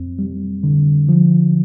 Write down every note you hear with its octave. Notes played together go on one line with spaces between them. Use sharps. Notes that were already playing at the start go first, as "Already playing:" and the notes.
Already playing: F2 C4
G3
D3
F3